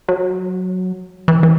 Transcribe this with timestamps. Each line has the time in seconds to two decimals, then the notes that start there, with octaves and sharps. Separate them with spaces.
0.08 F#3
1.28 E3
1.43 E3